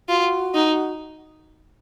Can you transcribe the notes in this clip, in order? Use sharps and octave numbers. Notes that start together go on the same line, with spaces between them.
F4 F#4
D#4